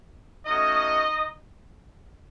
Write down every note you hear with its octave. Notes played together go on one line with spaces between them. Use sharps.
A3 C#4 D#4 F#4 D#5